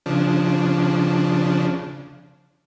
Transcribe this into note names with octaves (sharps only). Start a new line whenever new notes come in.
C#3 F3 D4